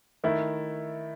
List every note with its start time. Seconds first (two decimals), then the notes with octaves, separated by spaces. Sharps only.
0.24 D#3 A3 E4